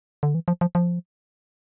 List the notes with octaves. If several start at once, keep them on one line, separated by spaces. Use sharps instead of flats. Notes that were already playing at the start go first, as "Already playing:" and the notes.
D3
E3
F3
F3
F3